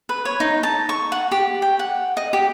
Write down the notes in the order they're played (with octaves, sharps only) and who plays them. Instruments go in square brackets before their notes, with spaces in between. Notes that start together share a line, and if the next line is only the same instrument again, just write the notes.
[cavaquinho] B4
C#5
D#4
A5
C#6
F#5
G4
G5
F#5
D#5
G4